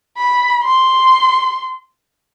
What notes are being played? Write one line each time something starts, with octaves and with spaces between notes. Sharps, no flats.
B5
C6